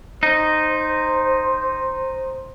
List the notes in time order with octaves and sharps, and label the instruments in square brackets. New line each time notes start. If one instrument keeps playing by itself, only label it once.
[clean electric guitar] D#4 [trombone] C5